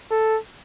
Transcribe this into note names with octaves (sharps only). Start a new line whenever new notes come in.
A4